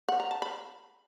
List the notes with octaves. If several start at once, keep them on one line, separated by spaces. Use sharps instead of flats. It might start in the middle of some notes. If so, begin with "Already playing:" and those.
F#5
A#5
A5
B5